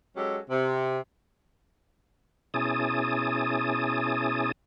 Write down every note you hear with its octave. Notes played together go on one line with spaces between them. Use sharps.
F#3 G#3 C#4 G4 A4
C3
B2 C#4 E4 G#4 A5 D#6